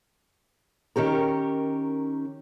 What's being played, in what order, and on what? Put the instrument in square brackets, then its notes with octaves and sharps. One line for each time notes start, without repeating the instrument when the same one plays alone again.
[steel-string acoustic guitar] D#3 C#4 G4 A#4